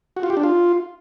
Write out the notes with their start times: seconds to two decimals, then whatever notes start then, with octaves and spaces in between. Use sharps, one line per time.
0.17 F#4
0.23 F4
0.30 G4
0.37 D4
0.43 F4